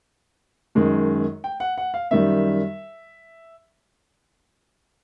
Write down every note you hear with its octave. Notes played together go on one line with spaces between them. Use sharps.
F#2 D#3 G#3
G5
F#5
F#5
F5
F#2 D#3 G3 E5